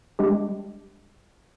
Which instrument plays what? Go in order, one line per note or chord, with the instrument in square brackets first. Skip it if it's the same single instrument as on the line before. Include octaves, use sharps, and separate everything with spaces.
[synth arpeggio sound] G3 G#3 D4 G4